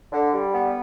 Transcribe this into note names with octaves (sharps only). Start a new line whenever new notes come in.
D3
G3
B3